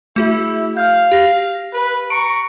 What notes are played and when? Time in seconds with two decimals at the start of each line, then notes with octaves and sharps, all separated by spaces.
0.16 A3 E4 F#4 G#4
0.77 F5 F6 G6
1.12 G4 A#6
1.74 B4
2.10 A#5 C#6 D7